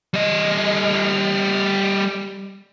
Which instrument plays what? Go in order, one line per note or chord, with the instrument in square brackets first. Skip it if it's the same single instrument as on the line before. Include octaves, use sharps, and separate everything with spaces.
[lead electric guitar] G3 D#5